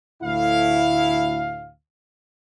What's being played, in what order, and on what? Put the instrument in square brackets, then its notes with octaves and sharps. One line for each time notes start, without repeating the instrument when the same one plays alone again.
[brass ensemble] D2 A2 E4 F5